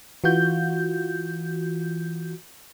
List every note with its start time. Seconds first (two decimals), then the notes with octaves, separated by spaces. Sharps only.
0.24 E3 F4 F#4 G6